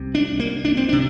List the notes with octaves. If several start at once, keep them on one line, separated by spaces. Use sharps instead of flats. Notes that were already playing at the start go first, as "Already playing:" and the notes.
Already playing: C2 C3
D4
A#3
D4
C4
C3 D4